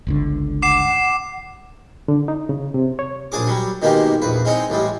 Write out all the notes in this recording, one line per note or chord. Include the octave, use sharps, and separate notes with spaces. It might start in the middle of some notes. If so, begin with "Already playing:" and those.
G1 C#2 D3
F#5 D6 C7 E7
D3
D#4
C#3
C3
C#5
A#1 D4 G#4 D6
F#3 G3
B2 D#3 G#3 A#3 G4
A#1 E2 B4
G#3 C4 C#4 D#4 G5
A1 G3 G#3